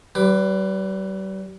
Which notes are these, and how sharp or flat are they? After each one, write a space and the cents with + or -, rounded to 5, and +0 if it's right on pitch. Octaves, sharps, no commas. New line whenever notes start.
G3 -40 B4 +15 D6 +5